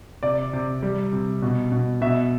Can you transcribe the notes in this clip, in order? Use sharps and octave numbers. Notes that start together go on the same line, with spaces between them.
C3 D5
C3
G3
C3
B2
B2
B2 E5